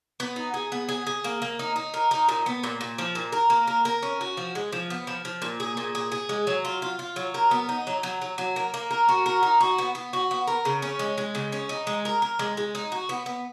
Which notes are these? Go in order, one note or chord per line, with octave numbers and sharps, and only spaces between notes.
B3
D#4
G#4
B3
G#4
G#4
A#3
A#3
D#4
D#4
A#4
D#4
A#2
B3
A#2
A#2
F3
A#2
A#4
A#3
A#4
A#4
C#4
F#4
F3
G#3
F3
B3
F3
F3
A#2
G#4
A#2
G#4
G#4
G#3
F#3
F4
F4
F4
F#3
A#4
B3
D#4
F#3
F#3
F#3
F#3
A#3
A#3
A#4
F#4
A#4
D#4
F#4
B3
B3
F#4
B3
A#4
C#3
C#4
G#3
G#3
C#3
C#4
D#4
G#3
A#4
A#4
G#3
G#3
D#4
F#4
B3
B3